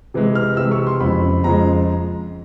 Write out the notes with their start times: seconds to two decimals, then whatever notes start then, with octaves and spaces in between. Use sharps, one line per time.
0.14 C3 E3 G#3
0.35 F6
0.57 C3 E3 G#3 E6
0.72 C#6
0.87 C6
1.00 F2 C#3 F3 G#3 B5
1.44 F2 C#3 F3 G#3 A#5